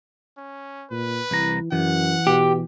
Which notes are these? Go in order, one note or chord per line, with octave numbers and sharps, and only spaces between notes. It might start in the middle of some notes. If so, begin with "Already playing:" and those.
C#4
A#2 B4
C2 E3 A#5
F#2 E3 F#5
B2 G4